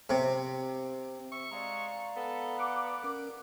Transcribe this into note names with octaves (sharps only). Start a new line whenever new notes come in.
C3
E5 C#6
G#3 D5 F5 A#5
B3 A4
F#5 D6
C#4 A#4